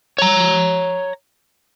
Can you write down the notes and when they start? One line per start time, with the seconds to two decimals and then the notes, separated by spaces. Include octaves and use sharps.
0.18 C#5 A#5